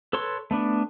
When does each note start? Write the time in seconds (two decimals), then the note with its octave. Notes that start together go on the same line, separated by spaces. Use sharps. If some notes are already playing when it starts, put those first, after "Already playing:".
0.13 A4 B4 C#5 C6
0.51 A3 B3 D4